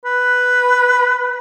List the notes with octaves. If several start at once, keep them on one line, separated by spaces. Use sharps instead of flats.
B4